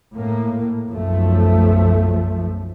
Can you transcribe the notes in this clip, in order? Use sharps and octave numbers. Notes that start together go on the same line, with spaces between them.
A2 A#3
B1 F#2 F3 A3